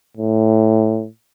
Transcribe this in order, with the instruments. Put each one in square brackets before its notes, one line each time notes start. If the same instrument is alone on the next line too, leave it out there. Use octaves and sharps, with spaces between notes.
[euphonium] A2